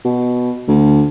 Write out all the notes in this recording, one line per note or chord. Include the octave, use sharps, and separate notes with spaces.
B2
D2